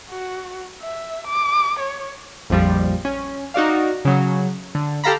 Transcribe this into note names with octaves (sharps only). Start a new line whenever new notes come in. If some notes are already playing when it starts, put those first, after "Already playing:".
F#4
E5
D6
C#5
A#1 F2 F3 G3
C#4
D#4 F#4 D5 F5
C#3 F#3
D3
G4 A4 F5 A#5 B5